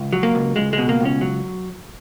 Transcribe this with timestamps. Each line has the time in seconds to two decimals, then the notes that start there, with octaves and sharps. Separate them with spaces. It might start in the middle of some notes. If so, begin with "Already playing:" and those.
Already playing: C#2
0.13 F#3
0.23 A#3
0.35 C#2
0.56 C#2 G#3
0.73 G#3
0.78 B2
0.89 A#3
1.00 C#2 C#4
1.21 F#3